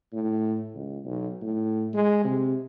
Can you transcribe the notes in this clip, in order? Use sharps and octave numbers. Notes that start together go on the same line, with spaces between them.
A2
C#2
B1
A2
G#3
C3